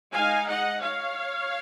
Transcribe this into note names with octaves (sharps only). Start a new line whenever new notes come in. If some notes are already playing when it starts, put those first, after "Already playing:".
G#3 D#4 F5 G#5
D#5 F#5
C#5 F5